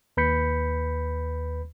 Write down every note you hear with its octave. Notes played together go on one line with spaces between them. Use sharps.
D#2 B4 B5 G6 B6 C#7